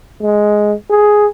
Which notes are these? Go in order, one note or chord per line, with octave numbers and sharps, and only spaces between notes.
G#3
G#4